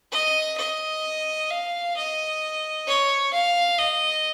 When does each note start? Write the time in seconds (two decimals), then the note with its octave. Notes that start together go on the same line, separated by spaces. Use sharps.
0.12 D#5
0.57 D#5
1.50 F5
1.96 D#5
2.87 C#5
3.33 F5
3.79 D#5